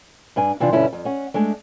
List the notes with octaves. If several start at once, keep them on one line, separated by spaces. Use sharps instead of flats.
G2 D4 G#5
C3 E3 F3 D4 F4
G2 B2 D3 C#4 E4
F2
C#4 F#5
G#3 A3 D4